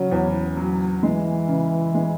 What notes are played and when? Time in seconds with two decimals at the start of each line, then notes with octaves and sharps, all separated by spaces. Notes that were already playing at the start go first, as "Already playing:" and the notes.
Already playing: C#3 F#3
0.12 E2
0.57 F#3
1.03 E3 G#3
1.48 C#3
1.95 G#3